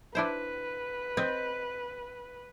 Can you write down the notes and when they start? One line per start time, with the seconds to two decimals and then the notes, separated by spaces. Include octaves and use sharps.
0.15 D4 E4 B4 C5
1.17 C4 D#5